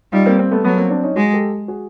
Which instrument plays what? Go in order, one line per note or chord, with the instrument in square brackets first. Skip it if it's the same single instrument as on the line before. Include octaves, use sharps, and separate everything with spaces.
[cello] G3 [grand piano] D#4 F4
[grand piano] A#3 C4
A#3 C4
A3 B3
[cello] F#3 [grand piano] A3 B3
[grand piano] A#3 C4
C4 D4
C#4 D#4
[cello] G#3 [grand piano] F#4 G#4
[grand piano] G4 A4
F#4 G#4